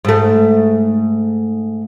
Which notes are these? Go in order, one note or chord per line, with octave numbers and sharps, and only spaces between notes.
G#2 A3